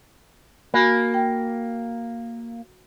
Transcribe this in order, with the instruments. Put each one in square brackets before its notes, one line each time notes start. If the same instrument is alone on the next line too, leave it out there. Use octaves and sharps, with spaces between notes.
[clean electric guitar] A#3 [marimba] F#4 G#5 B5
[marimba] G5